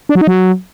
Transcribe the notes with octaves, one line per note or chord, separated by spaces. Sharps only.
D4
F#3
D#4
F#3